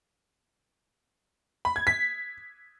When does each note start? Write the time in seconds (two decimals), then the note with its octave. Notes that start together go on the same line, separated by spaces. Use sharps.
1.65 B5
1.76 G#6
1.87 B6